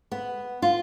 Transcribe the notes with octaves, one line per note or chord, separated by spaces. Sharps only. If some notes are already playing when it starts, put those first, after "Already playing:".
B3
F4